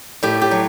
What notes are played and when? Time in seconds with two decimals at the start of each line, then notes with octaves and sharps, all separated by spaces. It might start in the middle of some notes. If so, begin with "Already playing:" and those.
0.23 A2 G4
0.41 G4
0.51 F#3